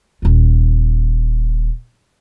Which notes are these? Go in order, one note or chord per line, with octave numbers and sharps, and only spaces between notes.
D#1 F4